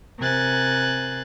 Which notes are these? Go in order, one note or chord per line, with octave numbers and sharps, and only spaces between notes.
C3 A#4 G#5 F#6 A6